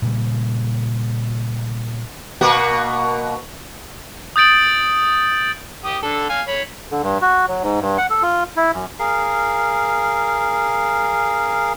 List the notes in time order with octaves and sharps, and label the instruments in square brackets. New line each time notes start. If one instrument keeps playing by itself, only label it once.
[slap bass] A#2 C#3 G3
[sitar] B2 A#3 F#4
[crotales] D#6 G6 A6 D7 F#7
[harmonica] G4 D#6
D3 A4
F5 G#5
C#5 B5
[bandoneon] D3
G2
F#4
F#3
G#2
G2
F#5
A4
F4
E4
F#2
[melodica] G#4 A#4 F5